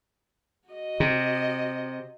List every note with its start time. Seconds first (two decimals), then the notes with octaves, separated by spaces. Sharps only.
0.68 F#4 D#5
1.00 C3